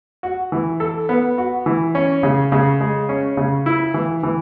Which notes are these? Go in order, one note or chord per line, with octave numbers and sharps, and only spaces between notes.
F#4
E3
A4
B3
F#4
E3
C#4
C#3
C#3
G#3
C#4
C#3
E4
E3
E3